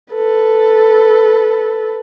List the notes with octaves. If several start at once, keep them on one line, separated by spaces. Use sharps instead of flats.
A4 B4